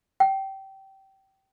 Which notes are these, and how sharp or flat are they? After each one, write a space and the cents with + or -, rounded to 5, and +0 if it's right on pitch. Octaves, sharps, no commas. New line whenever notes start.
G5 -20